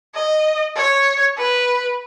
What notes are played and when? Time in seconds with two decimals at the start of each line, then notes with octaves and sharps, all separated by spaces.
0.15 D#5
0.76 C#5
1.38 B4